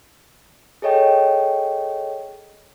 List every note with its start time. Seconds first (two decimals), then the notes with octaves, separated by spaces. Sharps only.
0.82 G#4 A4 C#5 D#5 G5